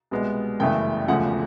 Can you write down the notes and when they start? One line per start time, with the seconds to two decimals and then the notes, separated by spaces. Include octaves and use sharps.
0.11 C2 B2 G#3 B3
0.59 G1 F#2 C#3 E3 A3 G5
1.08 E1 D2 C#3 F3 F#5